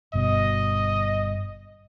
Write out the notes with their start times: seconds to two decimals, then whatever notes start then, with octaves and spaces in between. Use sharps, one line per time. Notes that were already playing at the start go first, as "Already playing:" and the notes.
0.13 G1 G2 B2 D#5